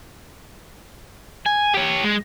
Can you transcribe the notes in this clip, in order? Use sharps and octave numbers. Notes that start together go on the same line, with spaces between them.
G#5
G4 C#5
G#3